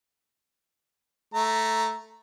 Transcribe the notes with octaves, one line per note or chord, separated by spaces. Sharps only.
A3 A#5